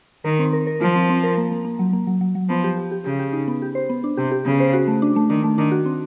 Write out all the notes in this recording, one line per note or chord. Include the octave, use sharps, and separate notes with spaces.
D#3 A#4
C4
A#4
A#4
F3 F4
C4
C4
A#4
A#3
A#3
A#3
F#3
A#3
F#3
F#3
F#3
F3 B3
G4
G4
G4
C#3 G4
G4
D#4
B3
G4
C5
B3
D4
C3 G4
G4
C#3 B3
C5
F#4
A3
D4
A3
D#3 D4
A3
D#3 D4
F#4
C4